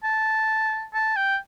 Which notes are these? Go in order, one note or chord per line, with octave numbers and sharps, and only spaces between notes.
A5
A5
G5